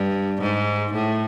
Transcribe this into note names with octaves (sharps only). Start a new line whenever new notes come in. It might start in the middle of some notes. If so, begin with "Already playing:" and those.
Already playing: G2
G#2
A2